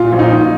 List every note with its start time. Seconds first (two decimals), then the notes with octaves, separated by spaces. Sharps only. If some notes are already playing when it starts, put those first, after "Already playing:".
Already playing: A#2 F4
0.13 A#1
0.19 D#4
0.32 A#1